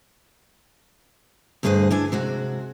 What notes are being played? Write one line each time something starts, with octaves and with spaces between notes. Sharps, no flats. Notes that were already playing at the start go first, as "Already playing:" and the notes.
D2 G2 G#4 B4 C5 D#5
D4 E4 G#5
C3 G#3 F#4